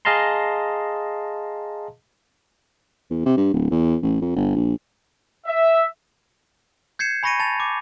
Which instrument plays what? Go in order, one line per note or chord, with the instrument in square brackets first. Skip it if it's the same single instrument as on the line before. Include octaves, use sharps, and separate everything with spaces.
[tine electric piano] G#4 D#5 F5 A5 A#5 C6
[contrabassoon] E2
C3
G2
D1
E2
A1
F2
G1
A#1
[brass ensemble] E5
[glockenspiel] G6 G#6 C7 C#7 E7
G#5 B5 C#6 A#6 C#7 D#7
A5 A6 F7
D6